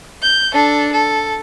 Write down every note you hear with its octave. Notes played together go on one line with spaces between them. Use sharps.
G6
D4 A4
A4